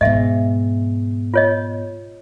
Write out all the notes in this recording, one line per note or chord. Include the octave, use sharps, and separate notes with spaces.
G#2 B2 D#5 E5
F4 C#5 D#5